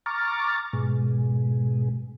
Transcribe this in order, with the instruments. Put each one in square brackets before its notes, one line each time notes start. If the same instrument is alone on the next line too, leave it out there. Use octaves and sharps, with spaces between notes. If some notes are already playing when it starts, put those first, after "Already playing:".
[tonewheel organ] A#5 C#6 D6 F6 A6
G#2 B2 G#3